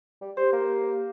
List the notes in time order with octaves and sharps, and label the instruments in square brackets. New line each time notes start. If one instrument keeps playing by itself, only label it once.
[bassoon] G3
[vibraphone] G4 [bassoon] C5
[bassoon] A#3